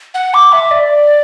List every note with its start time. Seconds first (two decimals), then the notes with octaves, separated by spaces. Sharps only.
0.14 F#5
0.34 D6
0.53 E5
0.71 D5